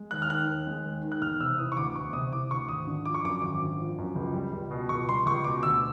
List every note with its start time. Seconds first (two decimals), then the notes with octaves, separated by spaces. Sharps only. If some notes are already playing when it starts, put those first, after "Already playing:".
Already playing: G#3
0.11 D#2 F#6
0.22 F6
0.29 D#3 F#6
0.47 D#2
0.67 G#3
0.84 D#2
1.03 D#3
1.12 F#6
1.21 E1 F6
1.41 C3 E6
1.58 E3 D#6
1.72 C#6
1.77 D2 D6
1.95 E1 C#6
2.13 C3 D#6
2.33 E3 D6
2.50 D2 C#6
2.68 G#1 D#6
2.87 D3
3.05 F3 D6
3.14 C#6
3.24 F#2 D6
3.42 G#1 D6
3.61 D3
3.79 F3
3.98 F#2
4.16 C#2
4.34 G3
4.53 C#2
4.71 B2
4.89 C#2 C#6
5.09 G3 C6
5.26 C#2 C#6
5.44 B2 D6
5.63 D2 E6